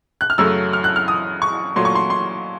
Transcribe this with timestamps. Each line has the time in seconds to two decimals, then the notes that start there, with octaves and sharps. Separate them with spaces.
0.21 F#6
0.30 F6
0.38 F#2 C#3 F#3 A3 E6
0.73 F6
0.84 F#6
0.96 F6
1.08 D#6
1.42 C#6
1.76 A#2 F#3 A3 C6
1.85 C#6
1.95 C6
2.10 C6